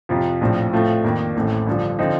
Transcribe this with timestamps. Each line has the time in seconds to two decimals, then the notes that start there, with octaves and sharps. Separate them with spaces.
0.09 F2 C3 F3
0.41 A#1 A2 F3 C4
0.73 A2 F3 A3 C4 F4
1.04 F2 D#3 A#3 D4
1.35 A1 A2 A3 C4
1.67 G2 D3 F3
1.99 D3 F3 C4 D#4